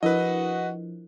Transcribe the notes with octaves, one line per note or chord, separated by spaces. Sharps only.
F3 D4 E4 F#4 A#4 B4 D#5